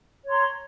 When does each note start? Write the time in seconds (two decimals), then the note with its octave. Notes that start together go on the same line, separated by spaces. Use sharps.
0.25 C#5
0.28 C6
0.30 A#5